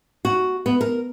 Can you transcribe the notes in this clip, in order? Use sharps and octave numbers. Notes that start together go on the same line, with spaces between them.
F#4
B3
A#4